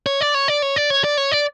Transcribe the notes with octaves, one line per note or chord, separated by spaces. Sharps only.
C#5
D5
C#5
D5
C#5
D5
C#5
D5
C#5
D5